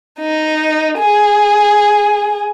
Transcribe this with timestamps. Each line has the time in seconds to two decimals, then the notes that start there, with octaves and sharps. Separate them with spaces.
0.20 D#4
0.98 G#4